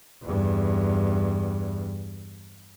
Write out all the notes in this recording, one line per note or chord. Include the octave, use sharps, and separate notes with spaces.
E2 G2